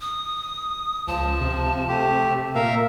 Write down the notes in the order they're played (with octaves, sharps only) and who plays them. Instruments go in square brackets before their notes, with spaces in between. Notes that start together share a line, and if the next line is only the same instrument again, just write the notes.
[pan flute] D#6
[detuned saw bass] C#2 [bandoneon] F3 [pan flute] A5
[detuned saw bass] C3
[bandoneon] A3 G4
[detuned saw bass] A#2 [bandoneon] A#4 E5 F5